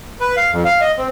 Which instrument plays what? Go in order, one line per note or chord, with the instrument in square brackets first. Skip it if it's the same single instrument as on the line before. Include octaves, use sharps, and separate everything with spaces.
[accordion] B4
F5
F2
F5
D#5
C4